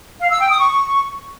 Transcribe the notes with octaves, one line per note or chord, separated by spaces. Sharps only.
F5
E6
G5
D#6
C#6